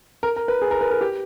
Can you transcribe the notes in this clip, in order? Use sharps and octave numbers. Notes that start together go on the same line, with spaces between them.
A#4
A#4
B4
G#4
A#4
B4
A#4
G4